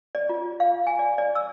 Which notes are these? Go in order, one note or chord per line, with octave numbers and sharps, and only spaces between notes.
D5
F4
F5
G#5
D5
D5
E6